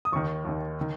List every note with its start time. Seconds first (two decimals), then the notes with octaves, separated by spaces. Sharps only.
0.05 D#6
0.12 D#2 D#3 C#6
0.45 D#2 D#3
0.81 D#3